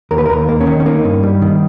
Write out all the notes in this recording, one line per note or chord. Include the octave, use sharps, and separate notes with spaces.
D#2 A#4
B4
A#4
D#2
A#3
C#4
D#3
C#4
A#3 D#4
G2
G3
D#3